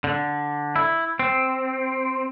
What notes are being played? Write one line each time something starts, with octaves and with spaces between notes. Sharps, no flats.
D3
E4
C4